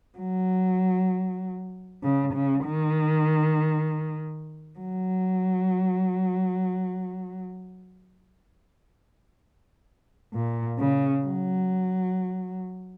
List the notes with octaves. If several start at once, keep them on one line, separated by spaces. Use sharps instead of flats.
F#3
C#3
C#3
D#3
F#3
A#2
C#3
F#3